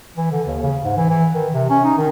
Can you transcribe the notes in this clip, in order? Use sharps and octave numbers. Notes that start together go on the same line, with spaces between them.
E3
D3
D#2
C#3
G#2
E3
E3
D#3
C3
C#4
D#4
D#3